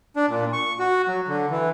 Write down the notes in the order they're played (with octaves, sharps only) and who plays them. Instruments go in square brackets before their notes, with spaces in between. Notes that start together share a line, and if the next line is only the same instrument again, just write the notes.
[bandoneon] D4
A#2
C#6
F#4
F#3
D3
E3